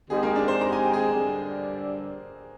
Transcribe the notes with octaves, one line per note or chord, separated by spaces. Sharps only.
D#3 G#3 C4 G4 G#4
A#3 A#4
D4 D5
C5 C6
A#5
G#5
G5
G#4 G#5
D3 G3